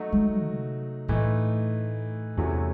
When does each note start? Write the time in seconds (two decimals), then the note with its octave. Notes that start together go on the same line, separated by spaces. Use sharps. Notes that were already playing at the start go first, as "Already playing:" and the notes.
Already playing: F#3 A3 D#4 F#4
0.12 G#3
0.45 C3
1.08 A2 E3 A3 D#4
2.37 E2 C3 E3 A3 C#4 F#4